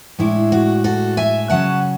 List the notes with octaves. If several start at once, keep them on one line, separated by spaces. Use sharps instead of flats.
A2 G#3 D4 E4
F#4
F#4 A4
E5 G#5
C#3 F#3 C#4 F#5 A5